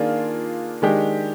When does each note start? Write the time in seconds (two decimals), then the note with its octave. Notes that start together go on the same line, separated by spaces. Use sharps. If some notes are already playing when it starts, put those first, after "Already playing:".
Already playing: D#3 A#3 D4 F4 G#4
0.82 D#3 G#3 D4 G4